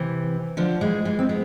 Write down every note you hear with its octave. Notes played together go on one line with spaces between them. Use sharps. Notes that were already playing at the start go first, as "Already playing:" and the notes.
Already playing: C3 E3
D3 F3
E3 G#3
E3 G#3
C4
G#3 B3